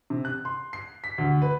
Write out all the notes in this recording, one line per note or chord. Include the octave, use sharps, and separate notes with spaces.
C3
F#6
C6
C7
B6
D2
B4